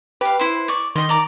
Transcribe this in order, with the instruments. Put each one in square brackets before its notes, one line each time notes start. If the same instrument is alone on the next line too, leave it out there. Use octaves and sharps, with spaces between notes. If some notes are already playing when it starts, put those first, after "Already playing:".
[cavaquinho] G4 F5 [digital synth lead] B4
[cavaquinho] E4 C5
D5 C#6
[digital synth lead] D#3 [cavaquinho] D#5 C6
[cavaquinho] D5 A#5 D6